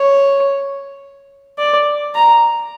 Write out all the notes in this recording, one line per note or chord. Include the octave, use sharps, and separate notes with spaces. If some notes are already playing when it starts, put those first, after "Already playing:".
Already playing: C#5
D5
A#5